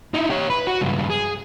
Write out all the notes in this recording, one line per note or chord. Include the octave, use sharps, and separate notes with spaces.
D#4 E4
G4 C#5
B4
F#4
C#2 G2
G#4